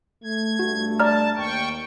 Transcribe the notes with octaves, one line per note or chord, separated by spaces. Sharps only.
A3 G#6
G2 A3 F#4
D5 A5 A#5 F6
D#2 G5 C#6